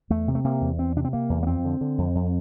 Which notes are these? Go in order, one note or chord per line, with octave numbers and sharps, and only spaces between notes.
E2 A3
C3
A3
C3 A#3
E2
E2 C4
C3 D4
C4
C3 A#3
E2
A#3
F2 C4
D3
D3
F2
F2